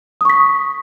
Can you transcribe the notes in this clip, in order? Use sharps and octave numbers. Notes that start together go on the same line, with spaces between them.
C#6 D#6 B6